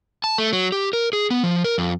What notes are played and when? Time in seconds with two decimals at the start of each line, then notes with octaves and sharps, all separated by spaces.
0.24 A5
0.38 A3
0.53 F#3
0.72 G4
0.93 A#4
1.13 G#4
1.30 B3
1.44 F3
1.64 A#4
1.78 F2